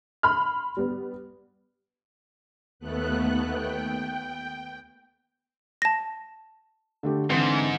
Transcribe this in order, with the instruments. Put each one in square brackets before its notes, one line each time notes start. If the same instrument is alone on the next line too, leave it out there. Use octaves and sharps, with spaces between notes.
[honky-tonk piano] B5 C6 F6
G3 B3
[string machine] D#2 A3 B3 F#6
G5
[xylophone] A5 A#6
[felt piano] D3 A3 G4
[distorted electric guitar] G#2 [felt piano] D3 E3 C4